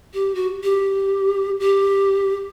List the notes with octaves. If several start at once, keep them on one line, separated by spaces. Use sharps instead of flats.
G4
F#4
G4
G4